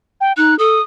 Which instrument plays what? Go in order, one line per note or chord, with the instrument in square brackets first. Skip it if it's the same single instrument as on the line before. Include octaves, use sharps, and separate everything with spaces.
[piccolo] G5
[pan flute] D#4 [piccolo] F#6
[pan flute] A4 [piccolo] D#6